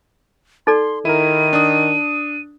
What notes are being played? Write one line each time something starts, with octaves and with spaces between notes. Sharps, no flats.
D#4 A4 D5 C6
D#3 E4 A#4 D#7
D4 D#6